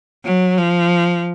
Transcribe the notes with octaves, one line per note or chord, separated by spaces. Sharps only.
F#3
F3